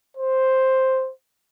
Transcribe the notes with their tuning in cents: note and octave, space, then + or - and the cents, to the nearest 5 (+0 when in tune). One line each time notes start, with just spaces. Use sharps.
C5 +5